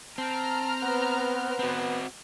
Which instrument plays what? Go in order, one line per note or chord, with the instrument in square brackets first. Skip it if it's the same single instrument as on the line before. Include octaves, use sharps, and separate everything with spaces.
[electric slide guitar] C4 [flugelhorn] A5 [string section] A#5 F6
[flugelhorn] B3 [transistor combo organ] B4 C5 F#5
[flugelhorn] B3 [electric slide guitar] C4 F#4